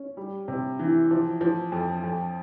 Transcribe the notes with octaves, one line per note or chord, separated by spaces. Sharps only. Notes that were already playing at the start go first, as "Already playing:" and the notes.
Already playing: C#4
G3
C3
E3
F3
F3
F2
F2